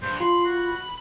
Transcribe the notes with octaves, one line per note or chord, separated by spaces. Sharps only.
G2 C5
F4 B5 C6
F#4